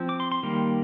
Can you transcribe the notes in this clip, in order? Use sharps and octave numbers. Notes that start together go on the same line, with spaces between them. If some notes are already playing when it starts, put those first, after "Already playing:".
Already playing: F3 C4
D6
C6
C6
D#3 G3 A#3